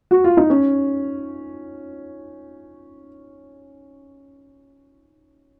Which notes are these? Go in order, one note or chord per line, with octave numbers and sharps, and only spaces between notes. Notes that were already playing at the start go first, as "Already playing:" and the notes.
F#4
F4
D#4
C#4